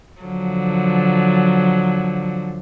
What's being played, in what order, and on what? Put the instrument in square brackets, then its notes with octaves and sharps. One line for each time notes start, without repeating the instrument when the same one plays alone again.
[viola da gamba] D3 F3 F#3